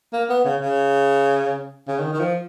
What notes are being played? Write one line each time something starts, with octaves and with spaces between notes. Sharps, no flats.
A#3
B3
C#3
C#3
C#3
D#3
D#3
F3